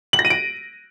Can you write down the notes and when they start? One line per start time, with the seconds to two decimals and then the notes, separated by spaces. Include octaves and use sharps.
0.13 F#7
0.19 A#6
0.25 D#7
0.30 D7